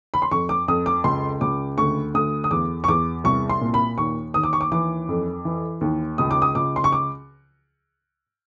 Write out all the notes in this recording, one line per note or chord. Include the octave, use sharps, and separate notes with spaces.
B5
C6
F2 C#6
D6
F2 D#6
D6
C#2 C6
C#2 D6
D2 C#6
D2 D#6
D#6
E2 D6
C#6
E2 D6
C2 C#6
C6
A#2
B5
D#2 C#6
D#2 D#6
D6
C#6
D6
E3 D6
F2
E3
D#2
C#2 D#6
D6
D#6
C#2 D6
C6
C#6
D6